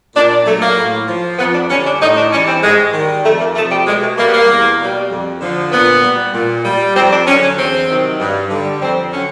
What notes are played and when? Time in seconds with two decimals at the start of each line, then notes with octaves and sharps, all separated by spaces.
0.16 A#2 D4
0.30 D4
0.46 F#3 A3
0.61 A#3
0.77 A2
1.08 F3
1.39 F2 B3
1.54 D4
1.70 D3 G3 C#4
1.86 D4
2.01 A2 D#4
2.16 D4
2.31 E3 G3 C#4
2.47 C4
2.63 G#2 G#3
2.93 D#3 G3
3.24 F2 A3
3.40 A#3
3.55 C3 F3 A3
3.71 G3
3.87 B2 G#3
4.02 A3
4.18 G3 A#3
4.27 B3
4.33 A#3
4.48 E2
4.79 B2 G3
5.11 F2
5.41 D3 F3
5.72 A#2 B3
6.03 G3
6.34 A#2
6.65 G3
6.96 F2 C4
7.12 D4
7.27 D3 F#3 C#4
7.43 C#4
7.58 E2 C4
7.89 C3 D#3 F#3
8.20 G2
8.51 D3 G3
8.82 F2 C4
9.12 D3 F#3 C#4